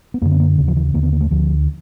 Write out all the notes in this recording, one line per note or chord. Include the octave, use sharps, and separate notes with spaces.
B3
F#2 D3 A#3
B3
A#3
D#2 C#3
F3
E3
D#2 D3 A#3
B3
A#3
A3
D2 D3 F3